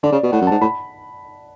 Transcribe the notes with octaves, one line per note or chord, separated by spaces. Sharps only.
D3 D5
C#3
B2
A2 F#5
F#2
G#2 A5
A2 B5